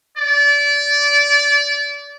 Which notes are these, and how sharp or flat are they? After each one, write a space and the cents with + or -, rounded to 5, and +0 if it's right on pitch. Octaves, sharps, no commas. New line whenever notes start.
D5 -25